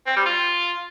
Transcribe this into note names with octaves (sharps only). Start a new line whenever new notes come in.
C4
G3
F4